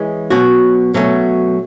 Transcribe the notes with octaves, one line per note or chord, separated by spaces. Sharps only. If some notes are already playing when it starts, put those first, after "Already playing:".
Already playing: E3 G#3 C#4 G#4
B2 F#3 C#4 F#4
B2 F#3 A3 C#4